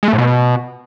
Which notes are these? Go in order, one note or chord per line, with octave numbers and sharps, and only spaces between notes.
G#3
A3
A2
B2